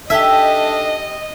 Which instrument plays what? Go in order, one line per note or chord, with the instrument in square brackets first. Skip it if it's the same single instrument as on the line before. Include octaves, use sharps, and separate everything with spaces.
[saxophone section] D4 D#4 A4 [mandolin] G4 G#5 [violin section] D#5 [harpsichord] E5